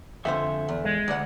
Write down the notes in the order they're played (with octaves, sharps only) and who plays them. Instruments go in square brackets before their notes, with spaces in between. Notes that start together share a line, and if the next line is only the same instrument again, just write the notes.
[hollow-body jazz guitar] F2 D3 C5 [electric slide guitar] A4 E5 G#5
[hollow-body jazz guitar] E2
[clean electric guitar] G#3
[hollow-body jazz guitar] D2 D5 F#5